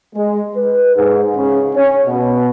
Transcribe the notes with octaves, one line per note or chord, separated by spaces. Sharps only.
G#3
B4
G#2
C#3
C#4
B2